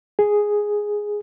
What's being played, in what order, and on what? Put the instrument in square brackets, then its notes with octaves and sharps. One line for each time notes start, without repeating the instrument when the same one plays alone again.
[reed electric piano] G#4